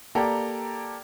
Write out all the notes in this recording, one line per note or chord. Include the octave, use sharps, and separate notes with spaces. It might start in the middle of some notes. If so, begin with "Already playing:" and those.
A#3 G4 A4 D5 A#5